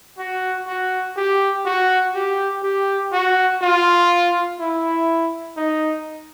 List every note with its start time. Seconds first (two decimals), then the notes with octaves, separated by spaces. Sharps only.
0.19 F#4
0.67 F#4
1.17 G4
1.66 F#4
2.15 G4
2.63 G4
3.13 F#4
3.62 F4
4.60 E4
5.57 D#4